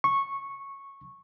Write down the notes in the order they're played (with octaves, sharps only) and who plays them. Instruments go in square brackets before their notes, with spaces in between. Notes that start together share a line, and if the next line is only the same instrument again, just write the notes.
[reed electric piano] C#6